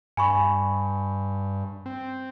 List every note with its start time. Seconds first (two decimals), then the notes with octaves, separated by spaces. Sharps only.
0.17 G2 G#5 B5 C#6
1.86 C4